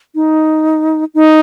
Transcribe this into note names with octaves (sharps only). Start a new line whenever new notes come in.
D#4
D#4